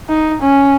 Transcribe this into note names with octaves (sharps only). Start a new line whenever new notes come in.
D#4
C#4